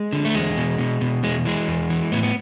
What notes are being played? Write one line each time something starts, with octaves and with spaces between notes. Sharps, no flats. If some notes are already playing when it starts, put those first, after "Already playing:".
Already playing: G#3
D3
A3
E2 G#3
B2
B2
B2
E2 G#3
E3 G#3
E2
E3
A2 B3
B3